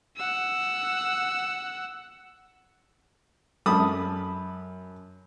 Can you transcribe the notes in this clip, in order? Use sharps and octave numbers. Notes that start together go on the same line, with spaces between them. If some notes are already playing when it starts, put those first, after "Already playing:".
F#5 E6
F#2 A5 B5 D#6